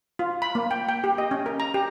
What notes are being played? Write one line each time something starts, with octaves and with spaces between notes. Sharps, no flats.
F4
B5
A#3
G5
G5
G4
D#5
C#4
A#4
A#5
G4